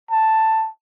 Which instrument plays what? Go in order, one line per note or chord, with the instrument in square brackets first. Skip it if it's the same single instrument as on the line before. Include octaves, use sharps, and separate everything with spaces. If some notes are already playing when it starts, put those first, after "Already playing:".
[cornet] A5